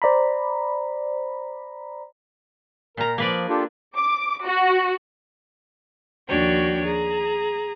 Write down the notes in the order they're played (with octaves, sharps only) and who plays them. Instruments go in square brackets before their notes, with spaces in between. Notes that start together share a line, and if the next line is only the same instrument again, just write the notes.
[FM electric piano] C5 D5 A#5 B5
[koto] A#2 A#5 [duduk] A#4
[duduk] F3 [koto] A#3 B4 D5
[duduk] D4 [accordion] F4 G4 A4
[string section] D6
F#4
[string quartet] D#2 F3 D4 F#4 C#5 G5
G#4 A#5